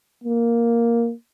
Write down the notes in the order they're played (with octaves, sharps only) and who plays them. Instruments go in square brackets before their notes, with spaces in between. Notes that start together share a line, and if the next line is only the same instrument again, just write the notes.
[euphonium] A#3